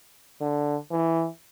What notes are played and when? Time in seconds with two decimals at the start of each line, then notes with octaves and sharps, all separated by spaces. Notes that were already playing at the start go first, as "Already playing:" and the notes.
0.41 D3
0.91 E3